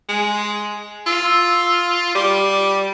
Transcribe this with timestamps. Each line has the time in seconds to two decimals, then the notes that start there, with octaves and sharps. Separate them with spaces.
0.09 G#3
1.06 F4 E6
2.15 G3 D6